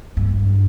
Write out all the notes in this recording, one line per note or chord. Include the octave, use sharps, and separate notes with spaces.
G2